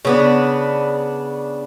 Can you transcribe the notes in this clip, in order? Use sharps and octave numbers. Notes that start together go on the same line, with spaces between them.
C#3 B3 D4